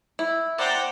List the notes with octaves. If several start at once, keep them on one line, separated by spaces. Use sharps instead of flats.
E4
C5 D5 F#5 G5 A#5